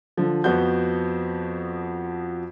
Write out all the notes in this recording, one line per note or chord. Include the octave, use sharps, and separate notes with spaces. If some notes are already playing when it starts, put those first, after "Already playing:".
D3 F3
F2 F3 B3 F#4 G6